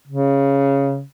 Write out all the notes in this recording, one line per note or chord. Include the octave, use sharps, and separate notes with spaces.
C#3